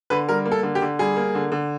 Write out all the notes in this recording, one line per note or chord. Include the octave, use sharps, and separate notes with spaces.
D3 B4
G3 A#4
A#3
A4
D3
G4
D3
G3 G#4
A#3
D3
D3